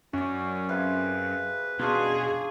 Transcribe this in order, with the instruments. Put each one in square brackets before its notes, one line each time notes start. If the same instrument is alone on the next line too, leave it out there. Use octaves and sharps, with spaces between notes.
[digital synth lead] F#2 [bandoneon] C#4 [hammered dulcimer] F#4 D5
[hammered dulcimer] C3 G#4 F5 [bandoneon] B4
[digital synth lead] B2 [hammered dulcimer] C#4 D4 F4 [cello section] G#4